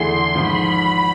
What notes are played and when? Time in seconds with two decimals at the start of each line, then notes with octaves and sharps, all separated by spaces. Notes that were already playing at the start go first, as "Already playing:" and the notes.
Already playing: E2 D3 A3 E4 G#4 C6
0.35 G#1 G#2 F3 B5